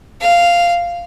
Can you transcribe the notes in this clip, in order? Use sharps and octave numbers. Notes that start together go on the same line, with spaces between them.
F5